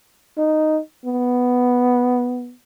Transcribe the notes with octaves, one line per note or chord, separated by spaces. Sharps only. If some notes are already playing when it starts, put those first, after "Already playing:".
D#4
B3